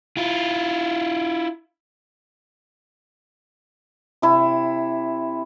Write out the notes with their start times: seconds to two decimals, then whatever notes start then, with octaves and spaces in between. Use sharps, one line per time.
0.17 E4 F4
4.22 C3 E4